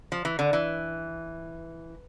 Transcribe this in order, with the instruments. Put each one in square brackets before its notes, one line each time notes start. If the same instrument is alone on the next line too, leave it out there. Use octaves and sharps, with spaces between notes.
[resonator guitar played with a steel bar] F3
E3
D3
E3